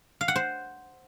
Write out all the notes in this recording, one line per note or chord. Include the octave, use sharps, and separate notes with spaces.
F5
F#5
C5